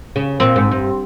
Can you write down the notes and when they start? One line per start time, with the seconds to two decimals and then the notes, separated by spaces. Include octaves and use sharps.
0.16 C#3
0.40 A#2 C4
0.56 G#2
0.71 G2